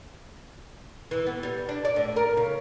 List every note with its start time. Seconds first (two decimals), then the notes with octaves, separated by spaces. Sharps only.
1.11 E3
1.27 B3
1.43 G3
1.69 D4
1.85 D5
1.96 A2
2.16 A#4
2.37 C#3